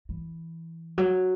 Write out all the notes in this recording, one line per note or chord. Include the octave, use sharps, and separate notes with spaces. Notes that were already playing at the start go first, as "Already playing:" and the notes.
E3
F#3